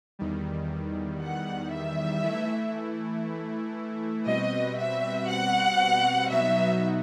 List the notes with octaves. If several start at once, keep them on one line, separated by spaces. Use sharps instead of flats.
E2 D#3 G3
F#5
E5
E3 A3 E4
B2 G3 C4 F#4 B4 D#5
E5
F#5
B2 F#3 B3 D#4 F#4 E5